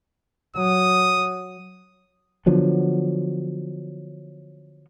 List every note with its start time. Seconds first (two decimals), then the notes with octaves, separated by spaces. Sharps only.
0.56 F#3 D#6
2.46 D3 F3 F#3 B3